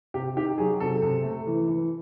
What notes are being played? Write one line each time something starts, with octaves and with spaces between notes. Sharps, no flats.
C3 G4
D#3 G4
F#3 G#4
C3 A4
C3
A3
E3
E3